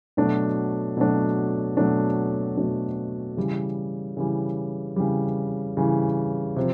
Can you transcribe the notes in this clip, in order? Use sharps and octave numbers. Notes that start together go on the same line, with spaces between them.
B2 F#3 A3 D4
B2 F#3 A3 D4
B2 F#3 A3 D4
B2 F#3 A3 D4
C#3 E3 G3
C#3 E3 G3
C#3 E3 G3
C#3 E3 G3
C3 F3